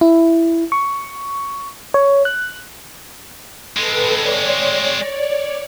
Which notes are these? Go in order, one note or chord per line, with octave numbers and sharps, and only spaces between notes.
E4
C#6
C#5
F#6
G#3 C4 A4 B4
C#5 D5